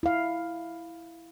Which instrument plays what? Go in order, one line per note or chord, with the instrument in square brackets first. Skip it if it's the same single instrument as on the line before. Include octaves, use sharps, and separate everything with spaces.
[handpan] E4 F5